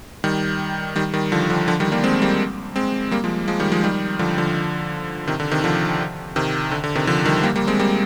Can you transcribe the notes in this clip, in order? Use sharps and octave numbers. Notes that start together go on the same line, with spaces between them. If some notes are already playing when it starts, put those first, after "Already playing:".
D#3 G3
D#3 G3
D#3 G3
D3 F3
D3 F3
D3 F3
D#3 G3
G3 A#3
G#3 C4
G3 A#3
G#3 C4
G3 A#3
F3 G#3
F3 G#3
D#3 G3
F3 G#3
D#3 G3
D3 F3
D3 F3
C3 D#3
D3
C3 D#3
D3 F3
C3 D#3
D3
D3
C3 D#3
D3 F3
D#3 G3
G3 A#3
G3 A#3
G#3 C4
G3 A#3